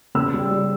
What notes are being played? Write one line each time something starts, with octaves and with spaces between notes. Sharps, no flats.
C#3 E6
G3
G3